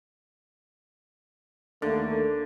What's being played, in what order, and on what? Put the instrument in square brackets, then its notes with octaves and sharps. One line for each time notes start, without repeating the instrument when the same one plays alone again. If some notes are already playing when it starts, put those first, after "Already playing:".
[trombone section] D#2 A3 A#3 [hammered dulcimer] D3